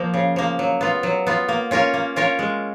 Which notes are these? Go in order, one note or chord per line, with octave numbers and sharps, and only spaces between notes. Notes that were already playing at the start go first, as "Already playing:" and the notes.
Already playing: F3 A#3
C#3
F3 A#3
F#3
B3 F4
F#3
B3 F4
A#3
C#4 F4 A#4 C#5
A#3
C#4 F4 A#4 C#5
G#3